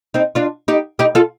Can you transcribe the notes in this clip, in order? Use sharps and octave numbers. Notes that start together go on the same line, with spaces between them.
C4 D#4
D4 F4
D#4 G4
D#4 G4
F4 A4